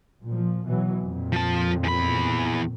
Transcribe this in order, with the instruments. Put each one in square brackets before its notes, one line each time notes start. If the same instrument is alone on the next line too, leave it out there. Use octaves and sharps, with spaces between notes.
[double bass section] A#2 F3
B2 E3 F#3
F2 A#2
[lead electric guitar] F3 A5
E2 B5